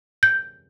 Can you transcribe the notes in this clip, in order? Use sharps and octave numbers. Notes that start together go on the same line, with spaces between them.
G6